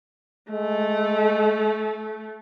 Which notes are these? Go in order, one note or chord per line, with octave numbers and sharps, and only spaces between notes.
G#3 A3